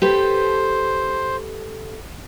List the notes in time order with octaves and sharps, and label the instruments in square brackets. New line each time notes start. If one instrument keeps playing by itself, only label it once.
[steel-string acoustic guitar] G4 A4 B4 [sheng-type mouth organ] C5